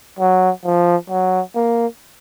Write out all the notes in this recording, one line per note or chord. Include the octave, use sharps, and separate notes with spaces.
F#3
F3
F#3
A#3